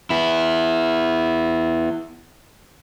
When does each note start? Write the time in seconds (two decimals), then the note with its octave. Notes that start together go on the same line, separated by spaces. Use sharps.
0.10 B3 E4